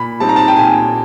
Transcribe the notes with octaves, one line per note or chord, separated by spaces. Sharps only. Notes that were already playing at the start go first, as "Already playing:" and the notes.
Already playing: A#2 B5
G3 C4 D#4 A5
A#5
A5
G5
A#2 G#5